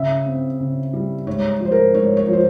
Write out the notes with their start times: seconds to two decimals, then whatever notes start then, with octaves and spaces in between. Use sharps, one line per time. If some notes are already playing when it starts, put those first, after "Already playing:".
Already playing: C#3 E5
0.26 C4
0.60 C#3
0.93 G3
1.27 G#2 C#5
1.60 F3 C5
1.72 A#4
1.94 G#2 C#5
2.17 C#5
2.28 F3
2.33 C5